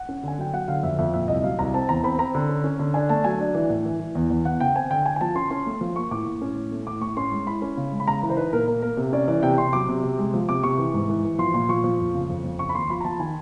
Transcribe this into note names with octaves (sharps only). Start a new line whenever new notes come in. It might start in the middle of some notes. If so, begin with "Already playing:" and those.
Already playing: F#5
C#4
D3 G#5
F#3 G5
F#3 F#5
D3 F5
F2 E5
F2 E5
A#2 E5
C2 D#5
F#3 F5
C2 A#5
C4 A5
E2 A#5
C4 B5
C4 A#5
D3
C#4
C#4
D3
D4 G#5
A3 A5
F#3 G#5
D4
E3
A2
E3
E3
E2
E2
E2 F#5
C#3 G5
C4 G#5
D3 G5
D3 G#5
G#5
F3 A5
C#4 C6
C#4 C6
A3
F3
A#3 C#6
A2 D6
A2
C#4
A2
A3
A2 D6
A2 C#6
C#4 C6
G#3
E4 B5
C#4
C#3
G#3
B5
C#3 A#5
E3
C5
D#4 B4
A#2 A#4
A#3 A#4
A#3 A#4
C3
C#4 D5
E3 D5
C3 G5
C3 C6
F#3 D6
C3
C3
G#3
F3
C3 D6
C3 C#6
E3
G#2
E3
E3
F3 C6
A#2 C6
F3 C#6
F3
F2
C#3
F2
F2
C#3 C#6
B5
D#2 C6
F3 B5
A#5
F3 A5
D#3 G#5